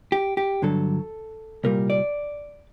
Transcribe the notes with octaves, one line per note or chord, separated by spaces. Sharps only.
G4
G4
G2 D3 F#3 A4
C2 A#2 G3 A#4
D5